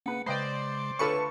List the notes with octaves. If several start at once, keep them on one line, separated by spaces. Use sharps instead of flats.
C#3 A#3 B4 F#5 C#7
C#3 G#3 B4 C5 D5 D#5 G5
D2 F4 A4 B4 C#5 C#6